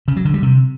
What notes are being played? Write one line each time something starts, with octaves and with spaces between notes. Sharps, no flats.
C#3
F#3
D3
G3
C3